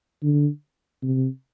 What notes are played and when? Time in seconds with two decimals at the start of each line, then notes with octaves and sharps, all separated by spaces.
0.23 D3
1.03 C3